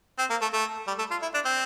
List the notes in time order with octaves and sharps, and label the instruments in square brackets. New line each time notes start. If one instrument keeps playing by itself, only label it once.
[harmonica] C4
A#3
A3
A3
G3
A3
F4
E4
D4
C4